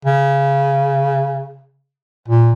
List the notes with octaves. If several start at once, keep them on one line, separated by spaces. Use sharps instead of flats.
C#3
A#2